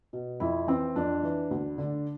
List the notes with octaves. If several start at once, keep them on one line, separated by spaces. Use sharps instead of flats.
B2
F2 E4
E3 C4
F2 D4
E3
D2
D3